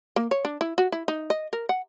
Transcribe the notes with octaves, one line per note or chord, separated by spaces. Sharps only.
A#3
C#5
D4
E4
F#4
E4
D#4
D#5
A#4
F#5